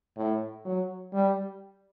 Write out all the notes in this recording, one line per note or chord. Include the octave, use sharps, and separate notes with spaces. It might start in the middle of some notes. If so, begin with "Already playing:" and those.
A2
F#3
G3